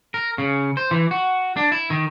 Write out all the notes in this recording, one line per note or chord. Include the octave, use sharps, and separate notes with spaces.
A#4
C#3
C5
E3
F#4
D4
E4
D#3